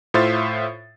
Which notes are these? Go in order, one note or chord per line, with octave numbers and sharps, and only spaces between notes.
A2 F4 C5 E5 F5 A6